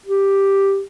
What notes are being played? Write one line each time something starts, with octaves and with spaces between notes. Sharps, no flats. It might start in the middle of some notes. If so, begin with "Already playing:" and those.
G4